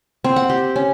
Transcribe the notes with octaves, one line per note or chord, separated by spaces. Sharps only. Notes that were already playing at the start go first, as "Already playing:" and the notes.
C4
F#5
G4
C#4